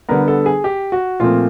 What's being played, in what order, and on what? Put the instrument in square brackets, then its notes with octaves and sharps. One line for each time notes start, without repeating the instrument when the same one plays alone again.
[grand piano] D3 G3 B3 A#4
A4
G#4
G4
F#4
A#2 F3 A3 C4 F4